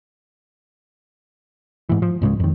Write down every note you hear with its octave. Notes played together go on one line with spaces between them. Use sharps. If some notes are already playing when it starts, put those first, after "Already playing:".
G#2 E3
F3
C#2 G#2 C#3 G#3
F2 D#3